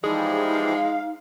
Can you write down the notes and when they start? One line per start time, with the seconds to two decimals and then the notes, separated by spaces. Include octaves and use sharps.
0.04 E3 F3 G3 G#3 D#4 G#4
0.53 F5